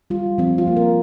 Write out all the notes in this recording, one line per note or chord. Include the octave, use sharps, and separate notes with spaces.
G3 F4
F3 C4
F4
A#3
A#4